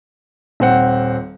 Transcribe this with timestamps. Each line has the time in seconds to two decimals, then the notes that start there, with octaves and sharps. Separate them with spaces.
0.60 D#1 C4 F#5